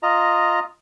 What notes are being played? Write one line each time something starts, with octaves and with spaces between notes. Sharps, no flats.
F4 D#5 A#5